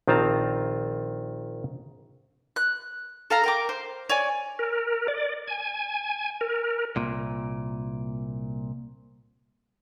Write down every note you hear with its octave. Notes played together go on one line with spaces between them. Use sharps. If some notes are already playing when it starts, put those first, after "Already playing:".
A#1 D#3 C4 F4 A5 A#5
F#6
A4 F5 A#5
A#4 G5 D6
C5
C#5 D5 G#5
A#4
D5
G#5
A#4
C2 A#2